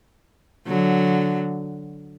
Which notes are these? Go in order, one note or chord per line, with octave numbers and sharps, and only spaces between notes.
D3 F#3